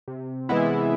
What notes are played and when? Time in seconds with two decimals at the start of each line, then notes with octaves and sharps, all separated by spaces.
0.08 C3
0.49 E3 G#3 B3 E4